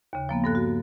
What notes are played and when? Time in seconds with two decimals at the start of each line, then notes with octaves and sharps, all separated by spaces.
0.13 D#2 C#3
0.29 F3 A#3 B3
0.44 G2 A4 F#6
0.55 F#4